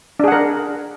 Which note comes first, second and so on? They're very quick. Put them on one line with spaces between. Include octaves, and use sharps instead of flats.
D4 G#4 F#5 A#4